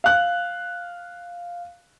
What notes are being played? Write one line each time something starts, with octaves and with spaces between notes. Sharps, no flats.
F5 F#6